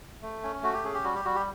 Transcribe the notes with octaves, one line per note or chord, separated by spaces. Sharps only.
A3
C#4
A3 F#4
G4
C#4 G#4
G4
G3 F#4
G4
G3 F#4
G4